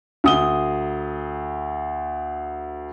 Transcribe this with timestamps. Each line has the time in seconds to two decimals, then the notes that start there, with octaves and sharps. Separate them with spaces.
0.24 D2 D#6 G7